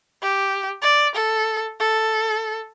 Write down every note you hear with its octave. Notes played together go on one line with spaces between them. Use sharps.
G4
D5
A4
A4